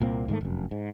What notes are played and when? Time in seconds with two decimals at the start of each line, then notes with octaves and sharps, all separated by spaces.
0.01 C2 A#2 A#3 C4
0.28 G#2 D#3 G3 A3
0.41 F1 F#2
0.71 G#2